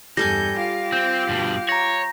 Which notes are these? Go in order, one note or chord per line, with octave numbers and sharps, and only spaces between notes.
E2 G2 G3 A4 G#5 G6 A#6
F4 G4 F5
C4 G6
G2 B2
C#5 A#5 A#6